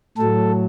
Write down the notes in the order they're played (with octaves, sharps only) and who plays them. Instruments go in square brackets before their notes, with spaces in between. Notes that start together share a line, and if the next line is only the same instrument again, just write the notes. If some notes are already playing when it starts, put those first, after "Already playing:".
[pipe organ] A2 F#3 A4